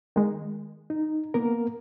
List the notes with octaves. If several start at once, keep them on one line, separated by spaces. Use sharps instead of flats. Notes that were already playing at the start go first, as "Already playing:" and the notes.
D#3 G#3
D#4
A#3 B3 A#4